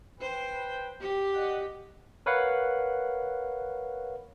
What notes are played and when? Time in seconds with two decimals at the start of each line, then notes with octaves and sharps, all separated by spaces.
0.20 B4 C5 G5
1.00 G4
1.33 D5 D#5 F#5
2.26 A#4 B4 C#5 F5 F#5